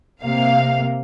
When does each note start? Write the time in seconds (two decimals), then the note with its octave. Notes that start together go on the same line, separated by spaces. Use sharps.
0.22 C3 A#3 F5